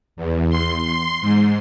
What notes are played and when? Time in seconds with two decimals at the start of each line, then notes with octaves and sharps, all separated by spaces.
0.16 E2
0.49 C6
0.81 C6
1.21 G#2